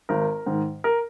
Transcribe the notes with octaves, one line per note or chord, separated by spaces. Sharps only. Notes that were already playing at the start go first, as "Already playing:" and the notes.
G#1 A#4
G#2 D#3
A#4